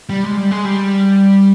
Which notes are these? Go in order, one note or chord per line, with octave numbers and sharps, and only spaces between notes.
G3
G#3
G3
G#3
G3